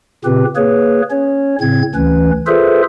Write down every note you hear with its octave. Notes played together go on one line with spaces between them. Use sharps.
A#2 C#3 C4 G4 B4
A#3 G#4 B4 C#5
C#4 C#5
A2 C#3 C4 G#6
D2 E3 C#4 B4
F4 G#4 A4 B4 C5 E5